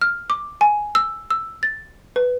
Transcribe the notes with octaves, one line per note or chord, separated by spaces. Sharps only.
F6
D6
G#5
E6
E6
A6
B4